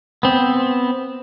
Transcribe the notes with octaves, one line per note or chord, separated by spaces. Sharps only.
B3 C4